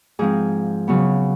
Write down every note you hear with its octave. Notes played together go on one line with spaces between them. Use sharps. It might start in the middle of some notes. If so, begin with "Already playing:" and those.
G#2 F3 G#3 C4 G#4
C#3 F#3 B3